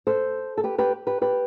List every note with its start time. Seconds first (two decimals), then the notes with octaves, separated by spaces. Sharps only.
0.07 A4 C5
0.58 A4
0.64 G4 B4
0.78 G4 B4
1.07 G4 B4
1.21 G4 B4